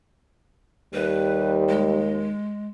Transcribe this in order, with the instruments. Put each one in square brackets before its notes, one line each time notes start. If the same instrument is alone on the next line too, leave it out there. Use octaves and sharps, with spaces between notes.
[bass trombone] D#2 [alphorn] G3 [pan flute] B4
[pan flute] G#3